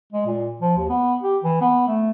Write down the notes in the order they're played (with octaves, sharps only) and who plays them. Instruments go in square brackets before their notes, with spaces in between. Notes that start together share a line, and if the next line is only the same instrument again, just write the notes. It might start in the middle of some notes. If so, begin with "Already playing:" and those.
[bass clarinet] G#3
A#2
F3
D#2
B3
G4
E3
B3
A3